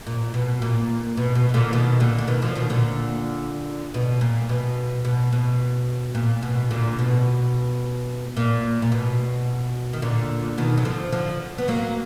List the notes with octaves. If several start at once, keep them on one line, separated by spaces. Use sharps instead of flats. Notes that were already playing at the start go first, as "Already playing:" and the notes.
A#2
B2
A#2
B2
B2
B2
A#2 D3
B2 D#3
A#2 D3
D3
B2 D#3
D3 F3
B2 D#3
A#2 D3
B2
A#2
B2
B2
B2
A#2
B2
A#2 D3
B2
A#2
A#2
B2
D#3
A#2 D3
B2 D#3
F#3
D3 F3
D3 F3
B3
F#3 A#3